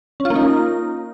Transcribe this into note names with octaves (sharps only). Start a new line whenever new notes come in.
C#4
F4
A#3
D#4